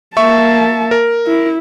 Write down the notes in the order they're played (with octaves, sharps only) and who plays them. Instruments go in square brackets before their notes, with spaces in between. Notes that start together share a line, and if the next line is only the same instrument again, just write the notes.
[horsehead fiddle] A#3 A5 [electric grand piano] E5 C#6
[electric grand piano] A#4
[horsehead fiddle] E4